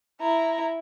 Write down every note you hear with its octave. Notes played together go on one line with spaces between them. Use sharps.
E4 A#5